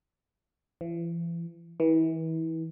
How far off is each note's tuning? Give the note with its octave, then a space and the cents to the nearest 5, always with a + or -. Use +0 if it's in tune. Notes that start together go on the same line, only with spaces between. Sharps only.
E3 +35
E3 -30